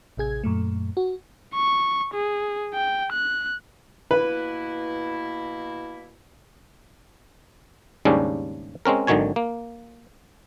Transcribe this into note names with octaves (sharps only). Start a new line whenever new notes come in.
A1 C3 G#4 G#6
F#2 A#2 A3
F#4
C#6
G#4
G5
F#6
B2 A#3 E4 B4
D#2 G#2 C#3 G3 C#4 D4
G#3 C4 C#4 A#4
G#1 D3 D#3 F#3 C#5 G#5
A#3